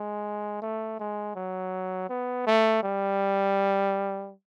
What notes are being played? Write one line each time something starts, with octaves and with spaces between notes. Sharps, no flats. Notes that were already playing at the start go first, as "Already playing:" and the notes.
Already playing: G#3
A3
G#3
F#3
B3
A3
G3